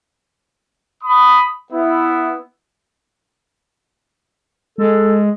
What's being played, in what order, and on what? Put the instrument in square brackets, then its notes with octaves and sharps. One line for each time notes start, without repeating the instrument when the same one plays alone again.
[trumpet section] B5 D#6
B3 E4
[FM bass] G#3 [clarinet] A4